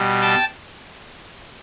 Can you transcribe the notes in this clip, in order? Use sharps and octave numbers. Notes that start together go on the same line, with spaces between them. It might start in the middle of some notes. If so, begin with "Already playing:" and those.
Already playing: B2 G3
G5 A5